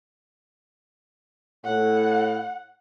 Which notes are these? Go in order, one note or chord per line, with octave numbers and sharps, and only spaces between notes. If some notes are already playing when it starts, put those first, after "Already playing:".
A2 F#5